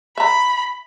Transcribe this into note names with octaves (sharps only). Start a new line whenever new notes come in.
E5 A#5 B5